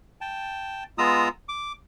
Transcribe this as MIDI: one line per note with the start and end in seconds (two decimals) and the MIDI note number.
0.21 0.84 79
0.21 0.84 81
0.98 1.29 56
0.98 1.29 59
0.98 1.29 65
0.98 1.29 82
0.98 1.29 87
0.98 1.29 88
1.49 1.72 86